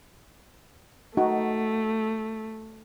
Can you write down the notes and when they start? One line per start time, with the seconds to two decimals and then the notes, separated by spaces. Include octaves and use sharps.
1.17 A3 D#4 F#4